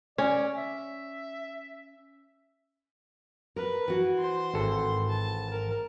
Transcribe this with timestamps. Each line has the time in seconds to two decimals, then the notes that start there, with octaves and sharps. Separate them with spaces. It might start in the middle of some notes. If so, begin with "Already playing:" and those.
0.18 C#4 D5
0.55 E5
3.56 A#4 B4
3.88 E3 F#4
4.18 C5 C6
4.54 G#1 A4
5.09 A5
5.52 A#4